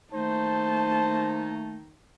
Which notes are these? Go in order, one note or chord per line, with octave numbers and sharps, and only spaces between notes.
D#3 A3 A#3 D#4 C5 A5